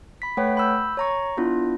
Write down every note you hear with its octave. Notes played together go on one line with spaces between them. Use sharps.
B5 B6
A3 B4 C#5 F#5 G5
B5 E6 G6
C#5 A#5 C#6
B3 D4 E4 F4